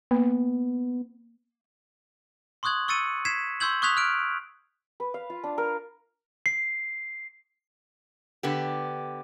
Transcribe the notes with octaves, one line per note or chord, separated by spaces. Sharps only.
A#3 B3
C6 C#6 D#6 F#6 G#6 F#7
C#6 E6 A6 C#7 D#7
G#6 B6 C7 E7
C6 C#6 E6 G6 G#6 F#7
C#6 D#6 F#6 G#6 B6 F7
F6 F#6 D7
B4
F5
F4
D4
A#4
C7
D3 B3 G4